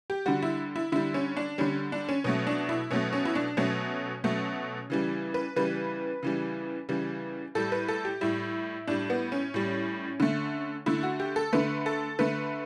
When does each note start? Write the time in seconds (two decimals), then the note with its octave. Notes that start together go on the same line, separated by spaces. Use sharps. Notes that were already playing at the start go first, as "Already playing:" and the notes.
0.10 G4
0.26 D3 G3 F#4
0.42 E4
0.76 E4
0.92 D3 G3 E4
1.14 C#4
1.37 D4
1.58 D3 G3 C#4
1.92 D4
2.09 C#4
2.24 B2 F#3 A3 C#4
2.47 D4
2.69 E4
2.91 B2 F#3 A3 C#4
3.13 C#4
3.25 E4
3.35 D4
3.57 B2 F#3 A3 C#4
4.24 B2 F#3 A3
4.90 C#3 E3 G3
5.34 B4
5.56 C#3 E3 G3 B4
6.23 C#3 E3 G3
6.89 C#3 E3 G3
7.55 A2 G3 A4
7.72 B4
7.88 A4
8.05 G4
8.21 A2 G3 E4
8.87 A2 G3 D4
9.10 B3
9.32 C#4
9.54 A2 G3
10.20 D3 A3
10.86 D3 A3 E4
11.03 F#4
11.20 G4
11.36 A4
11.53 D3 A3 B4
11.86 A4
12.19 D3 A3 B4